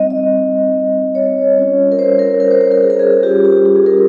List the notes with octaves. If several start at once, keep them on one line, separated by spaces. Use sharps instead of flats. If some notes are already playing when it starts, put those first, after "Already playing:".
Already playing: G3 C4 D#4 D#5
D#5
C#5
G3 C#4 F4
A#4
C5
A#4
A#4
C5
A#4
A#4
G#4
A#4
G#4
G3 C#4 F4 G4
G4
G4
G#4
A#4